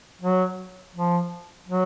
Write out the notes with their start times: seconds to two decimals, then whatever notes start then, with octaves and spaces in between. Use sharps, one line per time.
0.21 F#3
0.95 F3
1.69 F#3